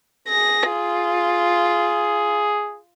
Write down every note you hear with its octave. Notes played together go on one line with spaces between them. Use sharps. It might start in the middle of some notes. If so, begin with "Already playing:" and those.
G#4 A#6
F4